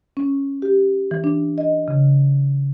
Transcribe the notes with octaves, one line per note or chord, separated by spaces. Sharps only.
C#4
G4
E3
D4
D#5
C#3